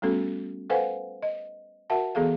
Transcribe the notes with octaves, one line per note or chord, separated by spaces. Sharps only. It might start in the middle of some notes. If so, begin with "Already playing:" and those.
G3 A3 B3 C#4 F#4 A4
A4 B4 C5 F5 F#5 G#5
D#5
F#4 A#4 E5 F#5 A5
E3 B3 G#4 A4 F5